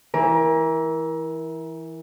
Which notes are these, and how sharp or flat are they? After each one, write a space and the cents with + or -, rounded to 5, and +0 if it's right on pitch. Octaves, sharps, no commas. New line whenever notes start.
E3 -10 A#4 +25